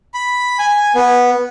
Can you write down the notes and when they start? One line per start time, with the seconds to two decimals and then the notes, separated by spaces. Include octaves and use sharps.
0.14 B5
0.59 G#5
0.95 B3